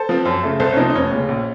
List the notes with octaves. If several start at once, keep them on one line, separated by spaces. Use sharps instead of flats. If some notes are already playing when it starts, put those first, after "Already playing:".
Already playing: A4 C5
F3 C4
F#2
C#3 A3
C2 A4 C5
C#4
C3 F3 C4 D#4
D#4
F1 C#4
D#2 C#3
A#1